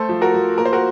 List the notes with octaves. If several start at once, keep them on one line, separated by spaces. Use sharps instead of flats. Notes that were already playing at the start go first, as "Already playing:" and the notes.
Already playing: A3 A4 C5
F3
F#4 A#4
F3
A#3 A#4
C5
F#4 A#4